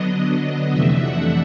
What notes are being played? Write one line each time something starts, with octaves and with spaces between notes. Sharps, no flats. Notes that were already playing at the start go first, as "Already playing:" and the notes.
Already playing: D3 F#3 B3 D4 D#5
F2 C3 E3 A3 D4 E5
F#5